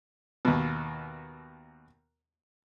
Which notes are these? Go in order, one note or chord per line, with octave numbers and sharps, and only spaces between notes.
D#2 B2